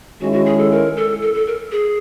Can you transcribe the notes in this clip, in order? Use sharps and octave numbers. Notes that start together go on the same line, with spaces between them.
D#3 G#3 C#4 E4 F#4
F#4
G#4
A4
A#4
A4
A4
A4
A#4
G#4